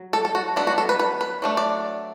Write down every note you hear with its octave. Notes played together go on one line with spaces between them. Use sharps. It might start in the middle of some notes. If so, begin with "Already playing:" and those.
Already playing: F#3
A4
A4
F#4
F#3 B3 D4 A4
F#4
A4
B4
B4
B4
F#3 A3 D4
D5